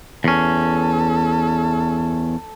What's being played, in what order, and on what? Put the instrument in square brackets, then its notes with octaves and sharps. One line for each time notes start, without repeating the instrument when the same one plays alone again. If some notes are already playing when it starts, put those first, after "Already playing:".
[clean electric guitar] E2 C#4 [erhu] A4